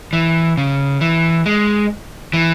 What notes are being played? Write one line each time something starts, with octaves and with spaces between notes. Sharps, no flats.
E3
C#3
E3
G#3
E3